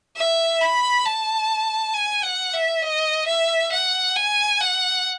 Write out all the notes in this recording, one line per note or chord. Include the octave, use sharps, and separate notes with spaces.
E5
B5
A5
G#5
F#5
E5
D#5
E5
F#5
G#5
F#5